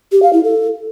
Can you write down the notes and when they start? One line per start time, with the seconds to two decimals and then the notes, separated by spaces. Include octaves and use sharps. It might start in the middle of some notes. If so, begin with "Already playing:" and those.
0.12 G4
0.23 F5
0.33 E4
0.44 A4